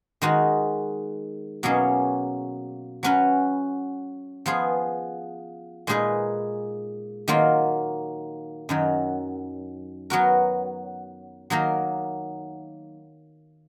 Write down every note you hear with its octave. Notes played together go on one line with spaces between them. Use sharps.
D#3 G#3 D#4 F#4
B2 F#3 A#3 C#4 G#4
F#3 C#4 F#4 B4
F3 B3 F4 G#4
A#2 G#3 D#4 G#4 B4
D#3 F#3 A#3 F4
F#2 D#3 F#3
F#3 B3 F#4 A#4
D#3 F#3 A#3 D#4 A#4